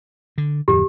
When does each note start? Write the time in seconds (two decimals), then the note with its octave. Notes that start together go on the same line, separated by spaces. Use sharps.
0.38 D3
0.68 D1 F2 G4